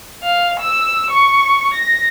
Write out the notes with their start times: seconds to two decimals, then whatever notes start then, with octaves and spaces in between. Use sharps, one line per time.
0.23 F5
0.59 E6
1.11 C#6
1.74 A#6